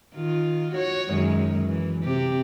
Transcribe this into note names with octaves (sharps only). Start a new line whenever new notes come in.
D#3 F4
F#4 C#5
F#2 D#3 G#3
E3
C3 G4